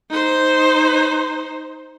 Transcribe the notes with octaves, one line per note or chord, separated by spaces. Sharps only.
D#4 C5